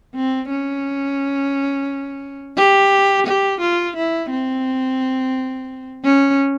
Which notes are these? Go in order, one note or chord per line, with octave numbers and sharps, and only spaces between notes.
C4
C#4
G4
G4
F4
E4
C4
C#4